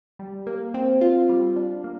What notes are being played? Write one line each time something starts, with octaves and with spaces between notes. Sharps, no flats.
G3
A#3
C4
F4
G3
D4
A#3